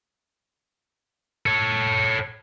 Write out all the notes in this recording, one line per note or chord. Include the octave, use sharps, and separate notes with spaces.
A4 C#5